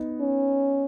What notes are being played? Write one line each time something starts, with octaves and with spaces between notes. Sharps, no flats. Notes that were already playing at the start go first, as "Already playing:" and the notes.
Already playing: B3 D#4
C#4